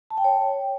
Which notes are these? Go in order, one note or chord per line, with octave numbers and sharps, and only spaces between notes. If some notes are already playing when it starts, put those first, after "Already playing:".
A5
G5
C#5